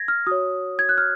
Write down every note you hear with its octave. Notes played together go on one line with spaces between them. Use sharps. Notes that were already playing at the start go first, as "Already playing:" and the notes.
Already playing: G#6 A#6
F6
F#4 C#5 D#6
G#6
F#6
F6